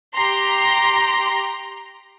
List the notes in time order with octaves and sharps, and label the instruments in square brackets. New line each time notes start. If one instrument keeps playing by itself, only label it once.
[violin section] G4 A#5 C6